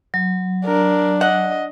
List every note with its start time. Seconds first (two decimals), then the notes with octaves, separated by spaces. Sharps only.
0.14 F#3
0.65 D4 A#4
1.21 D#5 F#5